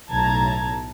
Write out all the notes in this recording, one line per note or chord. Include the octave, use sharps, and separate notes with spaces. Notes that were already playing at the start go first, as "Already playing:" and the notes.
B1 A2 A5 A#5 G#6